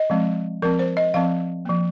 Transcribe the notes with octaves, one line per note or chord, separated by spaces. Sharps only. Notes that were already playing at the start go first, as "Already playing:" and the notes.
Already playing: D#5
F3 G#3 C4
F3 C4 A#4
C5
D#5
F3 C4 F5
F3 A#3